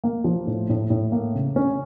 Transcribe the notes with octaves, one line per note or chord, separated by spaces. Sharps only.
A#3
F3
A2
A2
A2
A#3
C#3
C#4